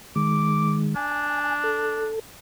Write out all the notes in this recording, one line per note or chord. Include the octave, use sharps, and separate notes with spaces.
D#3 G#3 D6
D4 G#5
A4